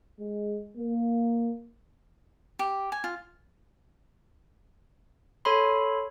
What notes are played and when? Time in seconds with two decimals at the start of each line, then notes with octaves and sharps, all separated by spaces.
0.20 G#3
0.78 A#3
2.59 G4
2.92 G#5
3.04 F4
5.45 A4 C#5 B5 C6